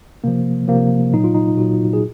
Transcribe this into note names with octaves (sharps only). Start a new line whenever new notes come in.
C3 F3 A#3
C3 F3 A#3
A#2 F#3 D#4
F4
D#4
A#2 F#3 F#4
G#4